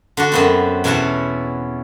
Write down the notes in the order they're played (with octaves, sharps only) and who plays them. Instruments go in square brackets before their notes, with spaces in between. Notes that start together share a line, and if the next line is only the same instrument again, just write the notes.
[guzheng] D3 D4 F#4
F#2 B3 C4
E2 B2 C#4 E4 F#4 A5